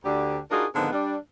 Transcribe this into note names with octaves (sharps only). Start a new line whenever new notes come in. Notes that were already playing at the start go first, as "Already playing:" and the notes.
D2 D3 G4
D4 D#4 F4 F#4 G#4 A#4
G#2 D3 D#3 F3 B3 C4
G3 D4